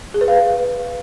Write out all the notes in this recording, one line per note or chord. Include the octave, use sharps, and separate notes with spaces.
G#4
B4
F5